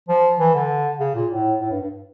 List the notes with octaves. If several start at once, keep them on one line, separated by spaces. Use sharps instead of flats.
F3
E3
D3
C#3
A#2
A2
A2
G2
G2